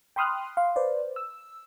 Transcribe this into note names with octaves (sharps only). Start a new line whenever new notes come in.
G5 B5 C6 D#6 F6 F#6
F5 C6
B4 C5 D5
E6